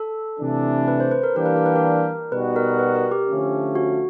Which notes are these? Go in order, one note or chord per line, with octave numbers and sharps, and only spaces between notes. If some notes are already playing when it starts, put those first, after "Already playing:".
Already playing: A4
C3 E3 A3 D4
B4
C5
B4
A#4
E3 G3 A#3 D4 G4 A#4
B4
A#4
B4
A#4
B2 G3 B3 D#4 F#4 B4
A#4
B4
A#4
G4
D3 F3 A3 C#4
F#4